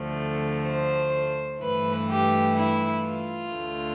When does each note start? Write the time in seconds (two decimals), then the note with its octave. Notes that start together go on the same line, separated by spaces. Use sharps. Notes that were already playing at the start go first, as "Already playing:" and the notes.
Already playing: D2 D3 F3 A3
0.68 C5
1.62 G2 E3 A3 B4
2.10 G4
2.56 E4
3.03 F4
3.50 D2 D3 A3